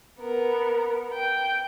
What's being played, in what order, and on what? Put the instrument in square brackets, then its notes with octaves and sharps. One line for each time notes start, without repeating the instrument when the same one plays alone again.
[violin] B3 A#4
G5